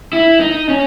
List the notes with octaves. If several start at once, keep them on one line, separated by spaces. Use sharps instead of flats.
E4
D#4
C#4